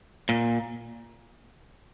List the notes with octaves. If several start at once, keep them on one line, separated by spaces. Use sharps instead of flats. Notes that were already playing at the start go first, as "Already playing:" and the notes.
A#2